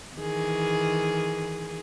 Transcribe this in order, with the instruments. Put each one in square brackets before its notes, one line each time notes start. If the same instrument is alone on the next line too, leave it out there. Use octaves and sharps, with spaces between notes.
[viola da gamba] D#3 E3 G#4